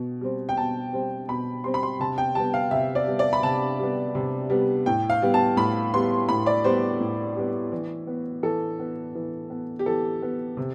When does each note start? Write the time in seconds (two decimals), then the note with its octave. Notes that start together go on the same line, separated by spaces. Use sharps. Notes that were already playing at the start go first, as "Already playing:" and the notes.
Already playing: B2
0.21 G3 C4
0.49 G5
0.57 B2 A5
0.93 G3 C4
1.28 B2 B5
1.64 G3 C4 C6
1.74 B5
1.83 C6
2.00 C3 A5
2.18 G5
2.35 G3 B3 A5
2.54 F5
2.71 C3 E5
2.95 D5
3.07 G3 B3
3.19 D5
3.33 B5
3.42 C3 A5
3.79 G3 B3
4.15 C3
4.50 G3 B3
4.86 A2 G5
5.10 F5
5.22 G3 B3
5.34 A5
5.57 A2 B5
5.93 G3 B3 C6
6.29 A2 B5
6.46 D5
6.64 G3 B3 C5
7.00 A2
7.36 G3 B3
7.72 E3
8.07 B3
8.43 E3 A4
8.80 B3
9.15 E3
9.50 B3
9.79 G4
9.86 E3 A4
10.22 B3
10.57 C3